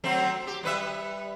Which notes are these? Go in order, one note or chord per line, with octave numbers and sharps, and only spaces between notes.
F#3 A3 C4
G4
G3 B4 E5